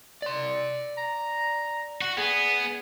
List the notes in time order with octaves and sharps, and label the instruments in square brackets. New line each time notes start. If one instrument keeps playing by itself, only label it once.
[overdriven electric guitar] D5 C6
[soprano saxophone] A#5
[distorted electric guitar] F#4
[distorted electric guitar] B3 [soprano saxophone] G#4